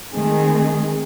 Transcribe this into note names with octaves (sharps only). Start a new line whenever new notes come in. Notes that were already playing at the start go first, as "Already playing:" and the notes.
D#3 G#3 A3 C4 G#4